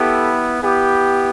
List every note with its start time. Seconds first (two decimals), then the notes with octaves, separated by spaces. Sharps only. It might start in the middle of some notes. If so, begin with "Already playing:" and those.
Already playing: B3 E4 G4 A4
0.63 B3 E4 G4